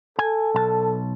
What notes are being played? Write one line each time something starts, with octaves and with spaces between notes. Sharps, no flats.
A4 G#5
B1 A5